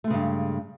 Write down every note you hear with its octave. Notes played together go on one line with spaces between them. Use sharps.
G2 C#3 G#3 A3